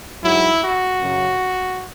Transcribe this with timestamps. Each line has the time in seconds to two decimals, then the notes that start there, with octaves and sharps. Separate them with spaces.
0.23 G#2 F#3 E4
0.62 F#4
1.00 F#2 C#3 F#3